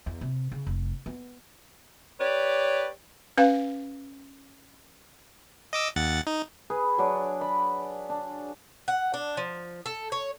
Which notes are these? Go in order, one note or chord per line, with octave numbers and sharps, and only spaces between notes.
E2
C3
C#3
F1
B3
G4 B4 C#5 D5
C#4 B4 F5
D#5 D6 E6
D#2 F#5 A6
D#4
G#4 B4
F#3 D4 D5
D5 B5
D4
F#5
D4
F3
A4
C#5